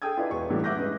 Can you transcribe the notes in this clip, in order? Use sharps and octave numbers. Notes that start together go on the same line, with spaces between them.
G#4 A4 G5 D#6 G#6
E4 F4 G#4 B4 D5 D#5
E1 C#6
F#2 A2 E3 G3 D5
E5 F#5 D6 F#6 G6 A#6
C#3 G#3 B4